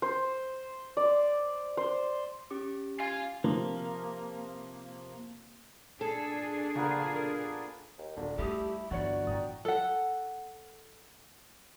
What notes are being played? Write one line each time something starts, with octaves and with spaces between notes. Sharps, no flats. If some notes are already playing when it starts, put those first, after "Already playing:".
C5
D5
C5
C#4 G4 D6
F5 G#5 C6
C3 F3 A#3
A#2 D4 G#4 A4
C#3 F3 A#3 B3
A#4
D#2
D#1 D3
G3 A3 D#4 E4 G4 D#6
G1 E3 F#3 F#4 C#5 D5 C#7
A2 E3 G5 A#5 D#6
A4 F#5